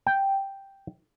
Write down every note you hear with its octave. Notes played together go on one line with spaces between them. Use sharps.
G5